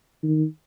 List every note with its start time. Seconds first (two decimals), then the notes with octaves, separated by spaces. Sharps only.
0.23 D#3